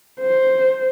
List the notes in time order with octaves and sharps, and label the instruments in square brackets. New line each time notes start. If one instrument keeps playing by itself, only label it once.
[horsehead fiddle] C5